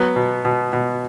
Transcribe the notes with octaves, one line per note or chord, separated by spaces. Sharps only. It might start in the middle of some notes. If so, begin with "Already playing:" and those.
Already playing: F#3 B3
B2
B2
B2